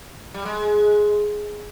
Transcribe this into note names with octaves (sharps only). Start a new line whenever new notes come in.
G3
G#3